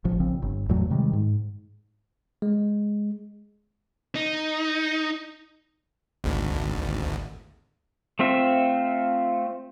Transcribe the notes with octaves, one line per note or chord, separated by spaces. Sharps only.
A1 F3
A#1 C#3 F3 C4
G1
E2 A2 F#3 A3
C3 D#3 G3 G#3
G#2
G#3
D#4
G#1 D2
A3 C4 F4 E5